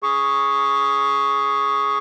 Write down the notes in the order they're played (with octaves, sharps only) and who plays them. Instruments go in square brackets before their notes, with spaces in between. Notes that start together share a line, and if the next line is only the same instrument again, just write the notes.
[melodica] G#4 C#6